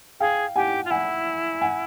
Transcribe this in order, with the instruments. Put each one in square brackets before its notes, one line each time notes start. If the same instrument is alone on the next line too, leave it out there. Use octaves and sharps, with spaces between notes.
[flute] G#4 [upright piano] F5 G5
[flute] G4 [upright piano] F#5 G#5
[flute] F4
[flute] E4 [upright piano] F#5 G#5
[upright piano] F#5 G#5